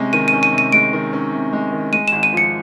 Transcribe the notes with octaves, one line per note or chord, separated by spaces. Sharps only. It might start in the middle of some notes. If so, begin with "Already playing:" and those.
Already playing: C3 G#3 C#4
D#3 D#7
D#7
C#4
D#7
C3
D#7
G#3 D7
D#3
C#4
C3
G#3
D#3
G#3 D#7
G#1 E7
D#7
F3 C#7